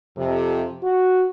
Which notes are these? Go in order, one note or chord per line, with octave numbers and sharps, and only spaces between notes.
F2 C3
F#4